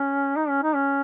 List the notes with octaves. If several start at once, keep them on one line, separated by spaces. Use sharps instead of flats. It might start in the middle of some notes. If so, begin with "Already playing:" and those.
Already playing: C#4
D#4
C#4
D#4
C#4